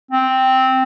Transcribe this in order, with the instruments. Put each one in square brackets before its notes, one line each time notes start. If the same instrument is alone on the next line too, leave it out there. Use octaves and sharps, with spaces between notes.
[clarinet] C4